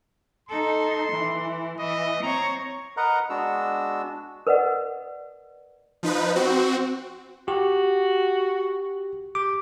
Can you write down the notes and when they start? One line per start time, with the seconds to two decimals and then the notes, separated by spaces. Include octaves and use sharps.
0.49 D#4 A4 C6
1.12 E3
1.79 E3 D#5 E5
2.23 C4 C#5 A#5
2.97 A#4 B4 D#5 F#5 A#5
3.30 G#3 B3 D4 F#4 E6
4.47 A#4 B4 D5 D#5 F#5
6.03 F3 D#4 B4
6.35 C4 F#4
7.48 F#4 G4
9.35 G4 D6